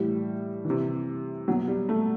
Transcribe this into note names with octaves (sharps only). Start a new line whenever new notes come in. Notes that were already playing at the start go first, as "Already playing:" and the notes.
Already playing: A2 E3 G3
E3
C3
B2 F#3
G3
A3